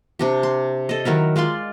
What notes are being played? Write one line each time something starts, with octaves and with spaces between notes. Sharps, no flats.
C3 D4 G4
C6
A4 D#5
D#3 F#3 E4 A#4
G#3 F4 D5 C6